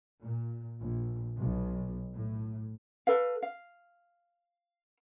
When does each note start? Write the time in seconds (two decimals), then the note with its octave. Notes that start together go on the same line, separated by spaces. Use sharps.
0.22 A#2
0.81 A#1
1.38 B1
2.14 A2
3.07 A4 B4 F5
3.42 F5